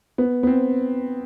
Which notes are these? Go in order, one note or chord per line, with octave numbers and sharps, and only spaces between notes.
B3
B3
C4